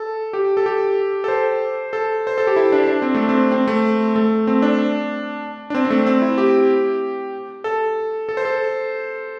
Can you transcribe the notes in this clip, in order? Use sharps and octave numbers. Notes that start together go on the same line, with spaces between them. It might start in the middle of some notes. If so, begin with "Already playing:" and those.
Already playing: A4
G4
A4
G4
A4
C5
A4
C5
A4
G4
E4
D4
D4
C4
A3
C4
C4
A3
A3
C4
D4
D4
C4
C4
A3
C4
E4
G4
A4
A4
C5
A4